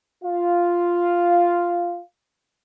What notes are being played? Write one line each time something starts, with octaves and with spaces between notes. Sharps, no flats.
F4 F5